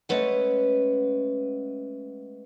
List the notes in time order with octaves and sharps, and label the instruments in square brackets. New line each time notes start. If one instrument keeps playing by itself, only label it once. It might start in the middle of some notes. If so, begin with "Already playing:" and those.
[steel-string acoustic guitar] G#3 A3 C#4 B4 F#5